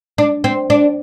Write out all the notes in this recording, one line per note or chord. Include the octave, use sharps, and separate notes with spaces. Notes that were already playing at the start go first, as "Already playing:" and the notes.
D4
C4
D4